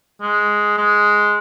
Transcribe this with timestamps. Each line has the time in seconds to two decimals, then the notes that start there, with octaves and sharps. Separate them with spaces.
0.22 G#3
0.78 G#3